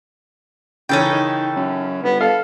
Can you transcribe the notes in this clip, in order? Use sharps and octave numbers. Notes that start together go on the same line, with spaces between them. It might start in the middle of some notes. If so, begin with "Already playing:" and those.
C#3 E3 C#4 D#4 A4 G5
D#3
F#2
G1 B3
A4 F5